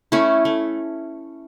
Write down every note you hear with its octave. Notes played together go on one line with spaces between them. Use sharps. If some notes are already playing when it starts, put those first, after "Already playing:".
A3 C#4 E4
A3